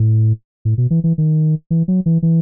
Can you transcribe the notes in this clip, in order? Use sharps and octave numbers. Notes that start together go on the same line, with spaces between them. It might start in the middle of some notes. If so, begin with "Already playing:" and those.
Already playing: A2
A2
B2
E3
E3
D#3
E3
F#3
E3
E3